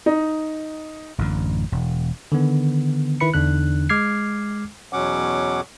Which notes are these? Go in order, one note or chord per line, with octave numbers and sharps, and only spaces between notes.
D#4
A1 F#2 D3
E1
D3 D#3 B3
D#3 E4 B4 B5 C#7
E2 D3 D4 D#4 F#6
G#3 D6 F6 G#6 C7
E2 B2 F#3 C#4 F#5 D6